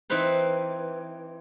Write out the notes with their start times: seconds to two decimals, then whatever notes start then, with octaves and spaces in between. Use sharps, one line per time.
0.10 E3 C4 D#4 B4 C5